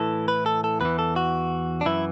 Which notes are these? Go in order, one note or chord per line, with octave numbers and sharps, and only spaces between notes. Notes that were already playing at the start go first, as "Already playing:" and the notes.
Already playing: A2 E3 A4
B4
A4
A4
E2 E3 B4
A4
F#4
D4
F#2 E3 E4